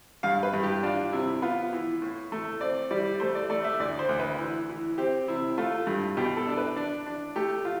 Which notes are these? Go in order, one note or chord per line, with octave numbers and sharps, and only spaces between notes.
G2 F5
B4
G2
G4
D4 F4
C3 E4
B3 F4
E3
A2
A3
C4 D5
G3 D5
A3 C5
D5
A3 D5
E5
D2 D5
C5
D2
B4
E3
E3
C4 G4
C3 E4
A3 F4
G2
B2 G4
A4
D4
B4
D4
D4
A3 G4
F4